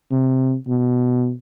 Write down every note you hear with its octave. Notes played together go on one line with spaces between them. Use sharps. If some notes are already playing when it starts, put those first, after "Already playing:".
C3
B2